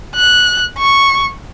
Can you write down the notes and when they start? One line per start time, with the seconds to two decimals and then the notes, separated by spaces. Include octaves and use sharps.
0.16 F#6
0.78 C#6